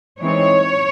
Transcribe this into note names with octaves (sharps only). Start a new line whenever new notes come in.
E3 G#3 C4 D#4 C#5